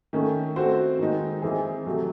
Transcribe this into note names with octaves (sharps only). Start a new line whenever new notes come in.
D#3 A3 C#4
A3 C4 F#4 C5
D#3 G#3 D#4
E3 C4 D#4 G#4
C3 F#3 A3